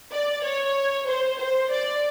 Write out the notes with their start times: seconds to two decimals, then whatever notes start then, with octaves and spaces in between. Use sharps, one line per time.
0.12 D5
0.44 C#5
1.08 C5
1.39 C5
1.71 D5